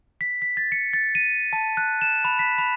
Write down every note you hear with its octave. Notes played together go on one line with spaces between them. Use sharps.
B6
B6
A6
C#7
A6
D#7
A5
F#6
E7
B5
B6
B5